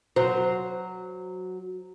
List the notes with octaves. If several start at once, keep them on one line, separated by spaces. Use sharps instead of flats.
F#3 C5